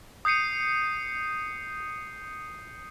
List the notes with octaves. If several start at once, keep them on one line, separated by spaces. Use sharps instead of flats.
D#6 G6 C7 C#7 D#7